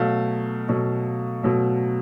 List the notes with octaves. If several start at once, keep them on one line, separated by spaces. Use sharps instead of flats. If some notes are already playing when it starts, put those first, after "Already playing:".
Already playing: B2 F#3 A3 F5
B2 F#3 A3
B2 F#3 A3